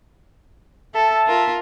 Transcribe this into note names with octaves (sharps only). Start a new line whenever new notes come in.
A4 E5 A5
F4 A#4